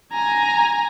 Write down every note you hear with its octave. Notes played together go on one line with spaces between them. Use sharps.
G#5 A#5